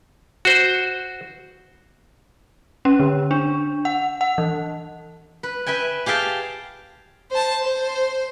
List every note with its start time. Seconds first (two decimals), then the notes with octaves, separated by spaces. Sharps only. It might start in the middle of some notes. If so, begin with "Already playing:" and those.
0.45 F#4 C5
2.85 C#4
2.99 D3
3.31 D4
3.85 F#5
4.21 F#5
4.38 E3
5.43 B4
5.66 B4 E5 G5 G#5
6.06 G4 G#4 F5 G5 A5
7.31 C5 A5
7.64 C5